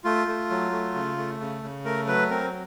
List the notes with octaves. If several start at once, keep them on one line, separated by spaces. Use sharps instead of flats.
A3 F4
A3
F#3
A3
C#3
A3
C#3
C#3
A3 A#4
F#3 B4
C4 A#4